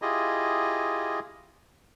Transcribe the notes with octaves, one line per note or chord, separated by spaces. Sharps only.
E4 F4 G4 G#4 D#5